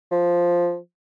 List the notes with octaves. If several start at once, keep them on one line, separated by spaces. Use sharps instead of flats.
F3